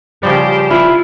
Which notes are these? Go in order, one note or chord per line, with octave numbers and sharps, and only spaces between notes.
C#3 F3 G3 G4 C5
E4 F4